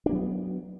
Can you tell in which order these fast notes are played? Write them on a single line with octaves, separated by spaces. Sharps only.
D4 A#3 F#3 B3